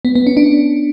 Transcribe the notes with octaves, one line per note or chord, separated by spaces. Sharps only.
B3
B3
C#4
D4